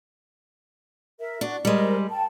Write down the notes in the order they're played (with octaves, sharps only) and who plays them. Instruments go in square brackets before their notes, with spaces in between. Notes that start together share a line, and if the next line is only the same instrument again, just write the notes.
[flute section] A#4 E5
[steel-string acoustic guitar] D4 [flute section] F#4
[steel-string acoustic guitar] G3 G#3 [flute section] A#4 C5 D#5
[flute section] G5 A5